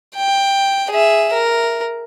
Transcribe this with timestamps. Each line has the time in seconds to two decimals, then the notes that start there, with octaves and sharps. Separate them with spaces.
0.15 G5
0.90 G#4 E5
1.33 A#4